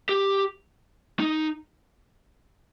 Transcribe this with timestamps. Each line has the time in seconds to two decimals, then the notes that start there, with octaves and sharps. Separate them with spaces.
0.09 G4
1.20 D#4